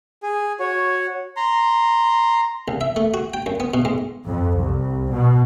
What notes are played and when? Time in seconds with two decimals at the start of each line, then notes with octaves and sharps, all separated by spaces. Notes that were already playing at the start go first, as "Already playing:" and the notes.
0.23 G#4
0.60 F#4 C#5
1.37 A#5 C6
2.68 C2
2.81 E5
2.96 A3
3.14 F#4
3.34 G5
3.46 F#2
3.60 B3
3.74 B2
3.85 G#2
4.28 F2
4.58 C2
5.11 B2